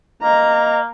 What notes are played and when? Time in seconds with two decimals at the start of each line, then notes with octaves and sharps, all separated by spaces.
0.22 A#3 D#5 A#5